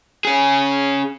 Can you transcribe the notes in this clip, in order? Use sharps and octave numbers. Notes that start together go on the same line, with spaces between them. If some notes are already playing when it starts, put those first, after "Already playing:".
C#4 G#4